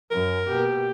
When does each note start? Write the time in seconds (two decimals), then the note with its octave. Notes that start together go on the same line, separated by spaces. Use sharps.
0.11 F#2 A#4
0.48 B2 A#3 G4